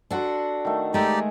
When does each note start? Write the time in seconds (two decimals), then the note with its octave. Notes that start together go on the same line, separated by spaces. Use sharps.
0.11 D4 F#4 A4 F#5 C6
0.65 D#3 A3
0.94 G#3 A3 D#4 G4 G#4 D5